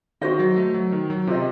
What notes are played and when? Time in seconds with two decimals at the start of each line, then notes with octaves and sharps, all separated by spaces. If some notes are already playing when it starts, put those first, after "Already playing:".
0.21 D#3 F#4 C5 D#5
0.39 F#3
0.57 A3
0.74 F#3
0.92 D#3
1.10 F#3
1.27 C3 F4 C5 D#5